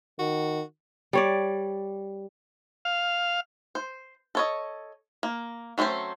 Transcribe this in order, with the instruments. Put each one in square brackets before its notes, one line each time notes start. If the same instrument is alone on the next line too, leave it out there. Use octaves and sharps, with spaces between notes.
[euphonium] D#3 [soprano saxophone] F#4
[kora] G3 C#5 D5
[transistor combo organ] F5
[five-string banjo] C5
A4 C#5 D#5
A#3
F#3 A3 C4 C#4 C5